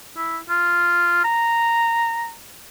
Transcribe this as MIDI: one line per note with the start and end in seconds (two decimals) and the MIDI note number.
0.17 0.37 64
0.50 1.20 65
1.24 2.32 82